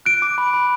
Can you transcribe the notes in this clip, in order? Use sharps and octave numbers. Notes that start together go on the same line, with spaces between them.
F#6 D7
D6
B5
B5